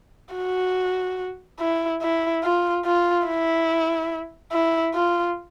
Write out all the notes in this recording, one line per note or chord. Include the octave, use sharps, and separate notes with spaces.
F#4
E4
E4
F4
F4
E4
E4
F4